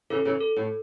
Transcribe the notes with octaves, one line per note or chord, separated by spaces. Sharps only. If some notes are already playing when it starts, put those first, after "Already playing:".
C#3 E3 A4
C#3 E3
A4
A2